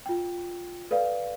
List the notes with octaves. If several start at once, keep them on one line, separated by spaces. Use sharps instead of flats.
F4 G5
A4 B4 D5 F5